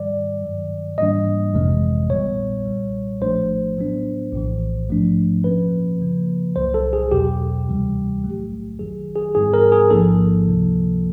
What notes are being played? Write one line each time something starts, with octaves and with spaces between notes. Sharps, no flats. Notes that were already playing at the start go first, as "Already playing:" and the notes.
Already playing: G#2 D#3 G3 D5
G2 D#3 F#3
G#2 E3 G3 A#3 D4 D#5
G1 F2 C3 E3 G#3
A#1 A#2 G3 B3 C#5
B1 A#2 G3
A#1 A2 F3 A3 D4 C5
A2 F#3 B3 D4
A#1 A2 E3
G#2 F3 A3 D4
A#2 F3 A#3 C#4 B4
F#2 C#3 F3 A#3
C2 A#2 F#3 C5
A4
G#4
E2 B2 F#3 G4
D2 C3 E3 G3
B1 A2 F#3 A3
G#1 F#2 D#3 F#3 G#4
G#4
G#2 E3 G3 B3 D#4 G#4
A#4
G#4
A1 G#2 F3 A#3 D#4 A4
C#2 C3 F3 A#3